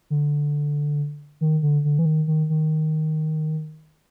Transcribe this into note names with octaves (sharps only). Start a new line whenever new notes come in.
D3
D#3
D3
D3
E3
D#3
D#3
D#3